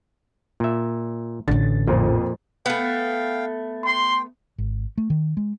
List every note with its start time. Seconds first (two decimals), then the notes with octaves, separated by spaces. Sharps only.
0.60 A#2 E5
1.48 A1 D3 C#4 A6
1.88 F2 A#2 C5
2.66 A3 B3 F5 G5
3.85 G5 C6
4.58 G#1
4.98 A3
5.10 D#3
5.37 G#3